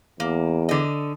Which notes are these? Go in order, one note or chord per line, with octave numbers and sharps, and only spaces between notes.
E2 A#3
D3 D#5